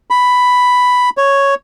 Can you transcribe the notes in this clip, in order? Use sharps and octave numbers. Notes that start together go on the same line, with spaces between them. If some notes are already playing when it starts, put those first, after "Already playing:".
B5
C#5